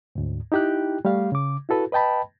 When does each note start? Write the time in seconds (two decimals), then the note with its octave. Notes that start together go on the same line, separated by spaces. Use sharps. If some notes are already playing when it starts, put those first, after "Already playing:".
0.15 D2 G#2
0.52 D#4 E4 G4 G5 F#6
1.05 G3 A3 G4 F5
1.32 C#3 D6
1.69 E4 F#4 A4 B4
1.92 B4 D#5 G5 A5 B5